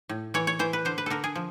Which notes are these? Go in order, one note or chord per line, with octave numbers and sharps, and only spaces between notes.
A2
E3 C#5
C#5
E3 C5
B4
D3 C5
B4
D3 A4 A#4
G#4
F3